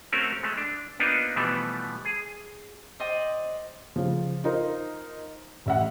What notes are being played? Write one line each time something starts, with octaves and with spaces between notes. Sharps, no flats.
A3 C4 C#4 F#4 A#4 C#5
G#3 A3
D4
A#3 B3 D4 D#4 F4
B2 E3 F3 G3 A3 B3
G#4
C5 D5 D#5 G5
C#3 F3
D#4 F4 A#4 C5
A1 E5 F#5